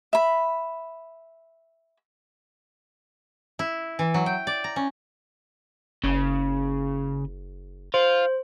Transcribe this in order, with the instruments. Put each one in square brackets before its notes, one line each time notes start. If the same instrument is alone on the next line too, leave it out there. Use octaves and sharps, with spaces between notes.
[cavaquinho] E5 B5
[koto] E4
E3
F#3
G5
D5
A#5
C#4
[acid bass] F#1 [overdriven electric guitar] C#3
[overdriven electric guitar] F4 [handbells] C5